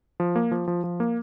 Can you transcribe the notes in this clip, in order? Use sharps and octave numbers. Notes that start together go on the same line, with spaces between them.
F3
A#3
F3
F3
F3
A#3